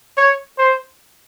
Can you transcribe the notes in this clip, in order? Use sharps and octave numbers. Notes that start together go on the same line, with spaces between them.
C#5
C5